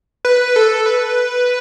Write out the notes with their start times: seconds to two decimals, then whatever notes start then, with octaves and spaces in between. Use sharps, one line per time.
0.25 B4
0.56 A4
0.86 B4